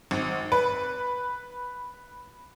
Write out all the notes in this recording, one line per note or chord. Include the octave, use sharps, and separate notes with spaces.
G#1
B4